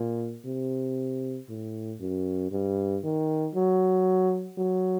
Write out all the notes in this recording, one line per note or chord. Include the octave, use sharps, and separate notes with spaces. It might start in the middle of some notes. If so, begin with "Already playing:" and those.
Already playing: A#2
C3
A2
F#2
G2
D#3
F#3
F#3